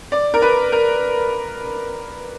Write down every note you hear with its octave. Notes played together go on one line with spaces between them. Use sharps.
D5
A#4
B4
A#4